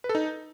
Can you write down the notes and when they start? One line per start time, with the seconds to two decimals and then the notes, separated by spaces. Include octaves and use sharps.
0.04 B4
0.09 A4
0.15 D#4